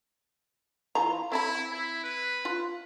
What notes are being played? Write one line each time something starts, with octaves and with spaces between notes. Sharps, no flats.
E3 F4 A#5
C4 E4 A5 B5
E4
B4
F4